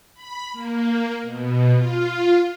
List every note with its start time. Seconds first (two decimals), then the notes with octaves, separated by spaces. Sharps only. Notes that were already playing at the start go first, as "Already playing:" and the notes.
0.14 B5
0.53 A#3
1.23 B2
1.73 F4